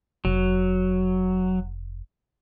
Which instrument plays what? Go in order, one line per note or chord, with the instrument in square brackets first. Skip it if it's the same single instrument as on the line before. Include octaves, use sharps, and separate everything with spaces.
[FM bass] F1 [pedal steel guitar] F#3